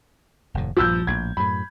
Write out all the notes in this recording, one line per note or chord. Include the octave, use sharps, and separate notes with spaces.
F1 D#2 A2
A#1 G2 F3 E6 G6
A#1 A2 G#6
F#2 A2 B5